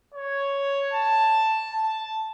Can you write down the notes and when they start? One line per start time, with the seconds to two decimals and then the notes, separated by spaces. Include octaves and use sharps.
0.14 C#5
0.93 A5
1.73 A5